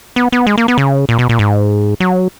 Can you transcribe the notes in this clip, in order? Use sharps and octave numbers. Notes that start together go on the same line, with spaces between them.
B3
B3
G#3
A#3
B3
C#3
A#2
B2
A#2
G#2
F#3